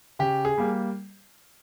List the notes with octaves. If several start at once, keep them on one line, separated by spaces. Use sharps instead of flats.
C#3 G4
G#4
G3 A#3